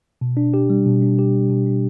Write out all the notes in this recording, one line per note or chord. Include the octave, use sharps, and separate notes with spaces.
B2
D4
G4
G3
B2
D4
G4
G3
B2
D4